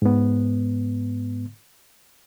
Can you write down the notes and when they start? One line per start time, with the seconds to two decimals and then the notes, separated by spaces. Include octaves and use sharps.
0.02 G#2 B3